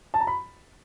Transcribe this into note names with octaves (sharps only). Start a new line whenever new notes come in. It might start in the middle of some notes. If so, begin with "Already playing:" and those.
A5
A#5
B5